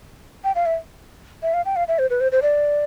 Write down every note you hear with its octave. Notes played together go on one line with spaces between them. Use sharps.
G5
F5
E5
E5
F5
G5
F5
E5
C5
B4
C5
C5
D5